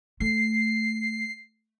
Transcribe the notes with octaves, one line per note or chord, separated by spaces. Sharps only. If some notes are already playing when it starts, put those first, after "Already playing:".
A3 C7